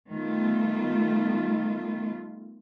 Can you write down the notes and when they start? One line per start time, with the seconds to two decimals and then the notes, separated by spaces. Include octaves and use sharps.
0.11 D#3 G3 A3 B3 F4